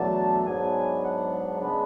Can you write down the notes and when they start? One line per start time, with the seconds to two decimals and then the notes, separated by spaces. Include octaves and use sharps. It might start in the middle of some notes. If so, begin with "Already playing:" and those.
Already playing: E2 B2 F#3 A3 D4 A5
0.46 G#2 F#3 B3 D4 G#5
1.04 F#5
1.62 C#3 G#3 B3 D4 B4